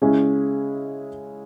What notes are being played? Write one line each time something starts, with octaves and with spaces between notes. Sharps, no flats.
C#3 G#3 C#4 E4